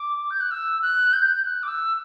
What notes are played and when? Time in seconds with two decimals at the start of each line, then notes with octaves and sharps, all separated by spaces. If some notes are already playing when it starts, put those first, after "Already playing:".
Already playing: D6
0.30 G6
0.40 F#6
0.51 E6
0.82 F#6
1.13 G6
1.45 F#6
1.63 D6
1.68 E6